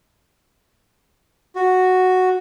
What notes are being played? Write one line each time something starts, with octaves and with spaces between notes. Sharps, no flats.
F#4